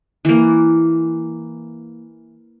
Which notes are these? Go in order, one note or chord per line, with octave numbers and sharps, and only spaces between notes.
E3 A#3